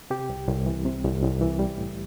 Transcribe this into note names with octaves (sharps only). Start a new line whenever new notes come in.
C3 G4
C2
C2
E3
C3
C2
C2
E3
G3
A2